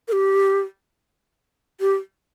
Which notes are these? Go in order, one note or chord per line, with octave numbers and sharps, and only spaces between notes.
A#4
G4
G4